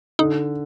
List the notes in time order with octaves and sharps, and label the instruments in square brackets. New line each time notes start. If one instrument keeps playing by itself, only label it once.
[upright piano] D3 [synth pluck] D#4